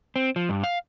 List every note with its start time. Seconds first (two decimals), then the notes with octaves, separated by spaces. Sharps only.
0.16 C4
0.36 F3
0.49 G2
0.63 F5